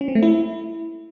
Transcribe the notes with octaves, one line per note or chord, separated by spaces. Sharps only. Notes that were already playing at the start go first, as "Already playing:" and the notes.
C#4
C4
A3
E4